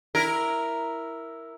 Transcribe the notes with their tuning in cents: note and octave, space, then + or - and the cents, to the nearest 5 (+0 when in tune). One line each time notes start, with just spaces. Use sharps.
E4 +0 A#4 +0